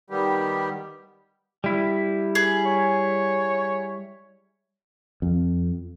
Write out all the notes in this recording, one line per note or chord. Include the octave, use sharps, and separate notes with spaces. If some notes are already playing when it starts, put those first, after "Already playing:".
D#3 G3 B3 G4
G3 E4
G#4
C#5
F2